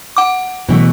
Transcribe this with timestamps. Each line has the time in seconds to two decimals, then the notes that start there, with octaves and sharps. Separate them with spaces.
0.17 F#5 D6
0.68 B2 E3 A3